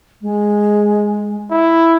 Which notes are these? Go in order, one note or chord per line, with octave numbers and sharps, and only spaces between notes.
G#3
E4